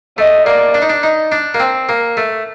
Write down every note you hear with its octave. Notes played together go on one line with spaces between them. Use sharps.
A3 D#5
A#3 D5
D4
D#4
D4
D#4
D4
A#3
C4
A#3
A3